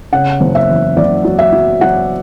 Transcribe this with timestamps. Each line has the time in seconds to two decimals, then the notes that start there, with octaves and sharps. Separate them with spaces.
0.13 C#3 F#5
0.41 F#1
0.55 E5
0.69 E2
0.97 F#1 D5
1.25 F#3
1.39 E5
1.52 F#3
1.81 F#3 F#5